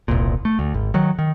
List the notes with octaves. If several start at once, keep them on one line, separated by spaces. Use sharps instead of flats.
E1 C2 A#2
A3
D2
G#1
D#3 F#3
D#3